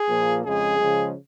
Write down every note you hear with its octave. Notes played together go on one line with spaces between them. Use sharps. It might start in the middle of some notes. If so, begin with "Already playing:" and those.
Already playing: G#4
A#2 F3 A#3
F2 C#3 G#3 G#4
C#3 F3 G#3